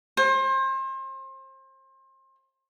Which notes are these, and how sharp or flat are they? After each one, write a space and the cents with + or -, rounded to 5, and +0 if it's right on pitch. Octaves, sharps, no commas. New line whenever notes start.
C5 +30